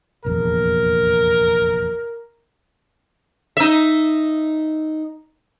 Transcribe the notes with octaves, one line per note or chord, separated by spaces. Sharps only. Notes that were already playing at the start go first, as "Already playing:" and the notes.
F1 A#1 E2 A#4
D#4 E5